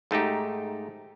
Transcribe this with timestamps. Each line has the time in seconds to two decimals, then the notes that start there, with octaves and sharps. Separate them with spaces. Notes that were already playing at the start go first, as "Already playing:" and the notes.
0.11 G#2 A3 D#4 G4